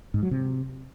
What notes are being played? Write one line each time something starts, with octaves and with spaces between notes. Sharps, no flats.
G#2
F#3
C3